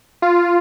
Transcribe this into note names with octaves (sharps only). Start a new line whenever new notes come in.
F4